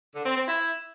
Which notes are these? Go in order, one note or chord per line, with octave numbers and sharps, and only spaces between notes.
D3
C4
C4
E4